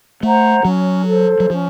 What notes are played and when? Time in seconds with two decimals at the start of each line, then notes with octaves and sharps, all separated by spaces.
0.23 A3 C5 F#5 A#5
0.65 F#3 C#4
1.07 A4 C5
1.40 F#3
1.50 F3 C#4